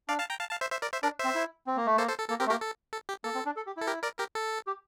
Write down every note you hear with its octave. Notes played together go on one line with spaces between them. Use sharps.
D4 D5 F5
F5 A5
G5 A#5
F5 A5
F5 A5
C5 E5
C5 E5
A#4 D5
C5 E5
D4 A#4 D5
C5 E5
C4
E4
C4
A#3
A3
A#3 A4 C5
A4 C5
A4
A#3 A4
C4 G4 A#4
A3
A#3 G4 A#4
A4
A4
G4
A#3 A4
C4
D4
A4
G4
E4 A4
G4 A#4
A#4 D5
G4 A#4
A4
G4